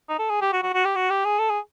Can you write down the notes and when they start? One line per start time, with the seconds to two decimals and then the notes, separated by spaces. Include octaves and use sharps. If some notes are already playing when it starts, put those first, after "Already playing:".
0.09 D#4
0.19 A4
0.30 G#4
0.41 G4
0.52 F#4
0.63 F#4
0.74 F#4
0.85 G4
0.96 F#4
1.10 G4
1.25 G#4
1.39 A4
1.50 G#4